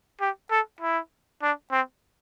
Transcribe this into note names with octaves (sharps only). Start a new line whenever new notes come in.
G4
A4
E4
D4
C4